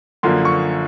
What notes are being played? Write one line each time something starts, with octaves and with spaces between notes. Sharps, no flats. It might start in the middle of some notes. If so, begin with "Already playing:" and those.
F#2 D3 F3 A#3 C6
C#6